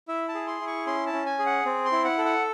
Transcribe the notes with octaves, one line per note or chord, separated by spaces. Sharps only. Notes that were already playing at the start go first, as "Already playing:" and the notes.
E4 E5
A5
G#4
C6
E4
C#6
C#4 C6
A5
C#4
G#5
G#4
F#5
C4
C6
E4
F#5
A4
F#5